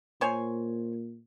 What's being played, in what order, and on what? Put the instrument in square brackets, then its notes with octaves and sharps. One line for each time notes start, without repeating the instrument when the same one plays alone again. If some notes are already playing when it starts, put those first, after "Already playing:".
[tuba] A#2 [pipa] C5 C#5 G#5